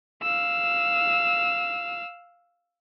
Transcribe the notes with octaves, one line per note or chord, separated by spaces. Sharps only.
F5 E6